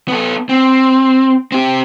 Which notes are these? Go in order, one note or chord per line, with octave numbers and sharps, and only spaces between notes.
B3 A4
C4
C4 G4